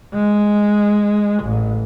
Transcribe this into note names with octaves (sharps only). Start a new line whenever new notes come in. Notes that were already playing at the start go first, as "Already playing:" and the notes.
G#3
A1